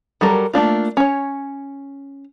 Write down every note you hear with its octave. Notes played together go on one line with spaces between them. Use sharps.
F#3 G3 A4 A#4
A3 A#3 D4 F4
C#4 C#5